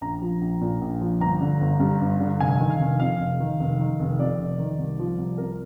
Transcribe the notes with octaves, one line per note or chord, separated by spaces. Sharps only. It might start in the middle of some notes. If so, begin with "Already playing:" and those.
A#1 A#5
F3
A#1
A#2
A#1
F3
G1 A#5
D3
G1
G2
G1
D3
F1 G#5
D#3
F5
F1
F2 F5
F1
D#3
F1
D#3
F1
F2 D5
F1
D#3
C2
F3
C2
C3 A#4